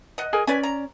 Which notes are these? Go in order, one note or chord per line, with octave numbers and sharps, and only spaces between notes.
D#5 F#5
G#4 A#4 G#5
C#4 B4 D5 G#5
A#5